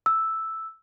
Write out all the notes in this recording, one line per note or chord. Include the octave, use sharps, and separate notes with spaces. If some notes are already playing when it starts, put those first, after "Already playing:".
E6